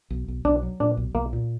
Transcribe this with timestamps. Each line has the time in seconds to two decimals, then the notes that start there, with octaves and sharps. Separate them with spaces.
0.10 B1
0.28 B1
0.45 B1 D4
0.63 F#3
0.80 A#2 D4
0.97 B1
1.15 B1 A#3
1.33 A#2